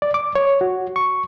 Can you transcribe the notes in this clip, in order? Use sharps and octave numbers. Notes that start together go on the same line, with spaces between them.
D5
D6
C#5
F#4
C#6